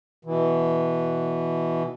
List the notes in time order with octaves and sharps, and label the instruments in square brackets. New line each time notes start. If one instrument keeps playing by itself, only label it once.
[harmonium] B2 E3